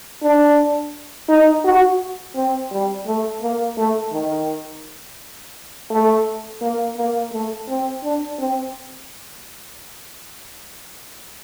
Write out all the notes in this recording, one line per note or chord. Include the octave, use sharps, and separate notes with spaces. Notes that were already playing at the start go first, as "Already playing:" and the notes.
D4
D#4
F#4
C4
G3
A3
A#3
A3
D#3
A3
A#3
A#3
A3
C4
D4
C4